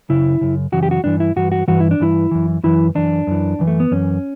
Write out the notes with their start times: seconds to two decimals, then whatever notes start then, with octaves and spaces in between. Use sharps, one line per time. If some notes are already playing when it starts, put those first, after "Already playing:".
0.09 F#2 C#3 E4
0.41 F#2 C#3
0.72 F#2 C#3 E3 F#4
0.83 G4
0.91 F#4
1.04 G2 E3 D4
1.20 E4
1.36 G2 E3 F#4
1.52 F#4
1.68 G2 E3 F#4
1.80 E4
1.91 D4
2.00 G2 E3 E4
2.31 F#2 E3
2.64 F#2 E3 E4
2.95 F#2 E3 D4
3.27 F#2 E3
3.59 F#2 E3
3.67 A3
3.80 B3
3.91 F#2 E3 C#4